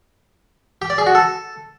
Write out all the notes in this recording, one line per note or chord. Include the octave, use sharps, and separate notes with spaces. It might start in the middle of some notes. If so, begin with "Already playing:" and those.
G4
D5
G#4
F#4
A4